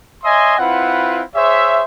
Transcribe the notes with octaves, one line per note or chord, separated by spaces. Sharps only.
C#5 D#5 E5 G#5 C6 D#6
C4 E4 F4 B4 F#5
G#4 C5 C#5 E5